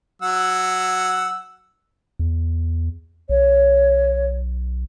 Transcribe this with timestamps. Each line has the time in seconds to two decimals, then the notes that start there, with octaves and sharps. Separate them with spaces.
0.22 F#3 F#5 E6
2.19 E2
3.29 B1 C#5